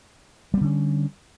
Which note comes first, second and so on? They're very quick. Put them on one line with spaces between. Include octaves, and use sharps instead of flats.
G3 B3 D3 C#4